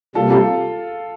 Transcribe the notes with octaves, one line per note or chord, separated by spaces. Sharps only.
C3 G3 A#3 F4 A4
F4 A4